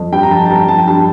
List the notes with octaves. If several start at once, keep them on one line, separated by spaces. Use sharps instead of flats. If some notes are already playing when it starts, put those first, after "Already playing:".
Already playing: F2
G2 G5
A#5
F3 A5
A5
G2 A#5
F3 A5
G5
G2 A5